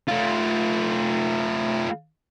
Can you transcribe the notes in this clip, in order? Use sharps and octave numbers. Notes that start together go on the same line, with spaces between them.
A3 F4